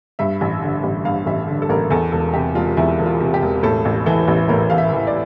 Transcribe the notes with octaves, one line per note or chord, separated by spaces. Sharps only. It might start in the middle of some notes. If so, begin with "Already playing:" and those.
G2 E5
A1
D3
A1
G2 F5
A1 E5
D3
A4
A1 A#4
E2 A4
E1 A4
C3 G4
E1 F4
E2 E4
E1
F4
C3
G4
E1
A2 A4
A1
E3 A4
A1
A2 A#4
A1 F5
E5
E3
D5